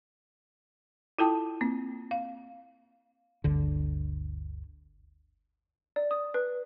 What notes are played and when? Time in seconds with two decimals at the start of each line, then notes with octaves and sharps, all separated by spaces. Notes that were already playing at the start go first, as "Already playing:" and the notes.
1.19 E4 F4 A4 G5 A5 D#6
1.61 A#3 C4
2.11 F5
3.44 G1 D2 D3
5.96 D5
6.11 D#6
6.34 B4